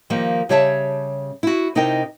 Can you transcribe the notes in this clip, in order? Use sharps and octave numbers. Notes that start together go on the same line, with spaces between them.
D#3 F3 G3 A#3
C#3 G3 G4 C#5 E5 A5
E4 F#4
C3 D#4 E4 A#4 D#5 G5